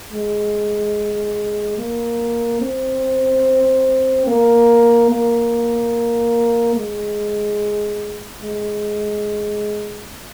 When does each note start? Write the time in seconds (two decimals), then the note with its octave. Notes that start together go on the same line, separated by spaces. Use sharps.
0.12 G#3
1.78 A#3
2.61 C4
4.27 A#3
5.10 A#3
6.76 G#3
8.42 G#3